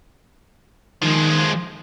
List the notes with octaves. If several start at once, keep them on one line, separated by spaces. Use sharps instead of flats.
D#3 F3 G#3